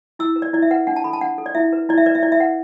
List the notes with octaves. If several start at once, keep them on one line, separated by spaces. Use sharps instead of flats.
E4 E6
B4
D5
E4 D5
E5
B4 F#5
D4 F#5
A5
A4 B5
A5
D4 F#5
A4
D5
E4 E5
B4
E4 D5
E5
B4 D5
E5
E4 D5
E5
B4 F#5